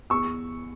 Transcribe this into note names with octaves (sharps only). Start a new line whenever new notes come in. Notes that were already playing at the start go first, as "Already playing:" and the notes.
E2 C#6 E6